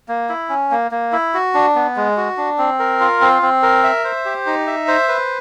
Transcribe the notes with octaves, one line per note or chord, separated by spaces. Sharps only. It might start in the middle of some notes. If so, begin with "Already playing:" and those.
A#3
E4
C#4
A#3
A#3
E4
F#4
D4
B3
G#3
F#4
D4
C4
A#4
F4
C4
C4
A#4
E5
C5
G4
D#4
E5
C5
B4